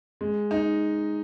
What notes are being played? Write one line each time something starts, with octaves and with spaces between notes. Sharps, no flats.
G#3
D#4